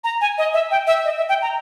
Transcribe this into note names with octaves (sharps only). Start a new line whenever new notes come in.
A#5
G#5
D#5
E5
G5
E5
D#5
E5
G5
A#5